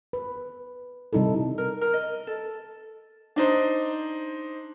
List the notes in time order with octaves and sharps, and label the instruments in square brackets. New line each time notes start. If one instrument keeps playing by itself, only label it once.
[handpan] B4
C3 G3 D#4 E4 A4
[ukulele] A#4
A#4
D#5
A4
[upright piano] D4 D#4 C5